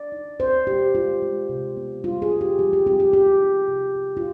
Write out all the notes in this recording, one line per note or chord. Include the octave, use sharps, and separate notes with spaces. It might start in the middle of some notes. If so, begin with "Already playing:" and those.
Already playing: D5
D#4
C4 C5
B2 G4
G#3 F4
G#3
C3
B3
G3 F4
G#4
G3
G4
F3 G4
G4
C4 G4
G4
B3 G4
D#4
C3
C3
F4